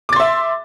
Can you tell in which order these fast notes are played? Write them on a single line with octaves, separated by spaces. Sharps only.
D6 A6 C6 E5